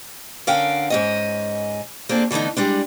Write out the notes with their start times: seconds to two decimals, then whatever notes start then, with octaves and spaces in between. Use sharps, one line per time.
0.47 D3 C#4 A#4 F5 G5
0.90 G#2 C#4 D#5
2.09 A#3 C4 D4 F4 G#4 A4
2.31 D3 E3 A3 B3 D#4
2.57 G3 G#3 D4